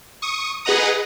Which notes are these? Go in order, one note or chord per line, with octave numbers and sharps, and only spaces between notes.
C#6 D#6
G#4 B4 D#5 F#5 A#5 D#6